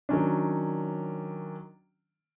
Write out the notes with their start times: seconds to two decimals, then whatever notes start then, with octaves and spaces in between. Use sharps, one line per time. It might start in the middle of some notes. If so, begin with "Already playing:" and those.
0.09 D#3 F#3 C#4 D4